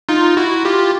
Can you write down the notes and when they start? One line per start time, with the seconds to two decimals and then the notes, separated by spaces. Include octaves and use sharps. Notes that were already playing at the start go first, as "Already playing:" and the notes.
0.09 D#4 F4
0.37 E4 F#4
0.65 F4 G4